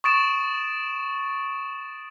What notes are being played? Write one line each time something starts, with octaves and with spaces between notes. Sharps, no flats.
C#6 D#6 A6 D7 E7